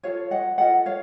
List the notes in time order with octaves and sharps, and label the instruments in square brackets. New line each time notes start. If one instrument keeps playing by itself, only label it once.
[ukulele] F4 A4 C#5 F5
D#5 F#5
F4 A4 D#5 F#5
C#5 F5